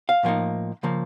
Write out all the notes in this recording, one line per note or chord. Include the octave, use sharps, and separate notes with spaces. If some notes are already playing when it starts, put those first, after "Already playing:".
F5
A2 F3 A#3 D#4
C#3 F3 A#3